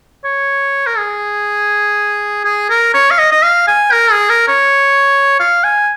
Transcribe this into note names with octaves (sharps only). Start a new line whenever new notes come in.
C#5
A#4
G#4
G#4
A#4
C#5
F5
D#5
D#5
F5
G#5
A#4
G#4
A#4
C#5
F5
G#5